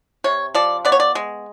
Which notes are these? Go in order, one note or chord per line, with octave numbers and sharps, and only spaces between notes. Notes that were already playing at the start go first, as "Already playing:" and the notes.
C3 C#5
F3 D5
B3 D5
C#5
D5
G#3